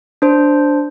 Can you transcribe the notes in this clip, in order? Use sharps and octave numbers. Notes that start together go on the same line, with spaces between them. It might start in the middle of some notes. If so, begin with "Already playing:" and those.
D4 C5